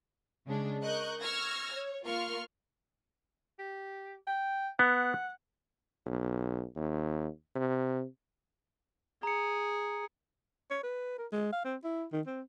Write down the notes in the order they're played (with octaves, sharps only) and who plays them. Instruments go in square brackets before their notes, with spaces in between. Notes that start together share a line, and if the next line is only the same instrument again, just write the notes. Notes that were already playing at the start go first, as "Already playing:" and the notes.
[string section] C#3 G#3 D4
A#4 D#5 C#6 F#6 G6
C#6 E6 F6 G#6 A#6
C#5
A#3 F4 A#4 C6 C#6 F6
[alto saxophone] G4
G5
[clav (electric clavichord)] B3 [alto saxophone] F#5
[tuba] B1
D#2
C3
[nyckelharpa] G#4 [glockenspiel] A#5 C#7
[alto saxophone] C#5
B4
A#4
G#3
F5
C4
E4
D#3
C4